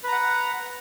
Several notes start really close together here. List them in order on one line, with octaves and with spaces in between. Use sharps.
B4 A#5 F#5